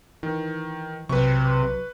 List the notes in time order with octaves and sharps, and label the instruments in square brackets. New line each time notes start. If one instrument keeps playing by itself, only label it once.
[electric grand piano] D#3 [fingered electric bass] E3
[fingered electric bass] B1 F#3 [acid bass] C3 [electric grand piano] B4 C#6